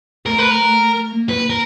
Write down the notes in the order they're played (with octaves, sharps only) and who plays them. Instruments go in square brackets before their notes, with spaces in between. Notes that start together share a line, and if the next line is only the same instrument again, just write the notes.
[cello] A3 [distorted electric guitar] A#4
[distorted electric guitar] B4
A#4
[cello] A3
A#3
[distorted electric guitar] B4
A#4